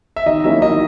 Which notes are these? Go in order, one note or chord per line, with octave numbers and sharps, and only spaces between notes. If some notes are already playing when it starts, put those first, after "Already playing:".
E5
D#3 D#5
F#3 A#3 C#4 E4 E5
D#3 D#5